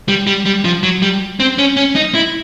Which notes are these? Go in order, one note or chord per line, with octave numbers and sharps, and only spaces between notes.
G3
G3
G3
F3
F#3
G3
C4
C#4
C#4
D#4
E4